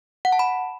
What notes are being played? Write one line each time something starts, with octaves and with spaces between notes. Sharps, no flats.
F#5
A5
B5